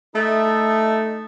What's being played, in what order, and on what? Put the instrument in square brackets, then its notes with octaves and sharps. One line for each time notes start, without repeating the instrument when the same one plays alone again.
[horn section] A3 D#4 E4 A4 D#5